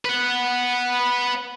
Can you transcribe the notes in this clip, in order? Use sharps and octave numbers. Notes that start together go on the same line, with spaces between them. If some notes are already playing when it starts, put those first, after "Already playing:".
B4 F#5